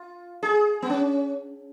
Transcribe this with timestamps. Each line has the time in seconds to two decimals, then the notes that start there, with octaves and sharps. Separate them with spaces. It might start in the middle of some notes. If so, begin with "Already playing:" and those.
Already playing: F4
0.43 G#4
0.82 B3
0.90 C#4